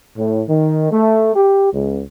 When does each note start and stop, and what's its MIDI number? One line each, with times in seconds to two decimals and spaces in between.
0.18 0.43 45
0.49 0.88 51
0.91 1.33 57
1.35 1.72 67
1.73 2.02 37